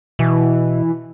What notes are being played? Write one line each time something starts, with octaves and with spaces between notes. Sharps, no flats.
B2 E3